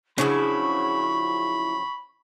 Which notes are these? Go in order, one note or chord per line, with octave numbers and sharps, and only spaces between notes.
C#3 F3 F#3 C#4 D4 E4 B5 C#6